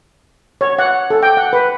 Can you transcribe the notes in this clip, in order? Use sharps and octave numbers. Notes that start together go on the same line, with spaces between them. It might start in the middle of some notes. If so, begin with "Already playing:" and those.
C#5
F#5
A4
G5
F#5
B4